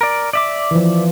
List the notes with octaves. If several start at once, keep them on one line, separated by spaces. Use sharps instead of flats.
A#4 D5
D5 E5 D6
E3 F3